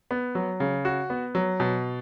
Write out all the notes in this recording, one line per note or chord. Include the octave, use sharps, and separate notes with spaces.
B3
F#3
C#3
F#4
B3
F#3
B2